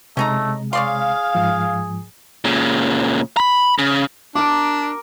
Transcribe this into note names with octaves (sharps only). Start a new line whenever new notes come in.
C3 G#3 A3 C#4 D#4 A#5
G#4 C#5 D5 F5 C6
G#2 F3
A#2 C#3
A#5 B5
C#3
D4 A#4 D6